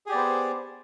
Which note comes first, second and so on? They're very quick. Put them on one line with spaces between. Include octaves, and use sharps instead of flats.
G#4 G4 D5 B3 C5